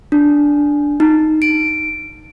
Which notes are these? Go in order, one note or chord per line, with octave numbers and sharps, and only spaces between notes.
D4
D#4
D7